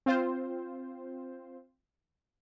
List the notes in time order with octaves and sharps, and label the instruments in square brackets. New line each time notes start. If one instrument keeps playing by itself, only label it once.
[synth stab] C4 F4 C5